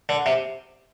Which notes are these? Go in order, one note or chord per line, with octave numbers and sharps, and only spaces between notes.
D3
C3